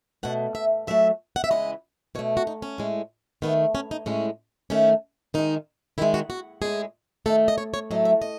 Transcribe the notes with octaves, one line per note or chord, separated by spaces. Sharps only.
B2 A3 F#5
E5
A2 F#3 A3 E5
F#5
E5
C#3 E3 G#3 D#5
B2 A3 C#5
F#4
D#4
C#4
A2 G#3
D#3 A3 B3
C#4
D#4
A2 G#3 C#4
D#3 A3 C#4
D#3 G#3 D#4
D#3 G#3 E4
F#4
F#4
A2 G#3 G#4
D#3 A3 A4
D#5
C#5
C#5
A2 F#3 A3 D#5
E5
D#5